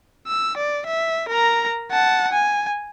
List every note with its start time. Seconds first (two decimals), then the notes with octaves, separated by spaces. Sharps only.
0.27 E6
0.57 D5
0.87 E5
1.29 A#4 A#5
1.91 F#5 A5
2.33 G#5